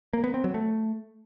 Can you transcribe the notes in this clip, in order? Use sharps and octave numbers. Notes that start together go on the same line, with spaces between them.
A#3
B3
C4
F#3
A3